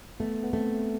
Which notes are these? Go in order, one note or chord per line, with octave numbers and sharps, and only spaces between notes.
A3 B3
B3
A3 C4